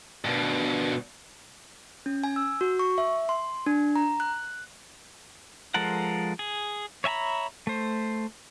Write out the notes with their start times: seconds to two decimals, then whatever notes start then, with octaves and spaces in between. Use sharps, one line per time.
0.24 G2 B2
2.06 C#4
2.24 G#5
2.36 E6
2.61 F#4
2.79 C#6
2.98 E5
3.29 C6
3.66 D4
3.96 A#5
4.20 F#6
5.74 F3 G#3 A4 A#4 F#5
6.39 G#4
7.04 C#5 E5 G#5 A#5 B5
7.67 A3 C5